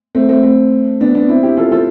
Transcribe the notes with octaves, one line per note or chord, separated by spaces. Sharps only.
A3 C4
A3 C4
A3 C4
B3 D4
B3 D4
C4 E4
E4 G4
F4 A4
F4 A4